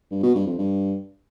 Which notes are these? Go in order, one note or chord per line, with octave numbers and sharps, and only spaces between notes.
G2
B2
G2
F2
G2